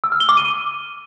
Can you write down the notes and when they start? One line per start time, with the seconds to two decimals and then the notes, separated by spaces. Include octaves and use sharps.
0.04 E6
0.12 F6
0.20 G7
0.29 D6
0.37 D#7